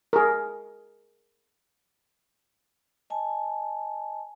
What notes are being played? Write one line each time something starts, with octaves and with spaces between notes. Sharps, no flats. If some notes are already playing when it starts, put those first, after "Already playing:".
G#4 A#4
D#5 G#5 A5